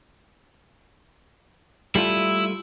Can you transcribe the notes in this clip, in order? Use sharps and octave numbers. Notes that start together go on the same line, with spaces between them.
G3 A3 E4 F4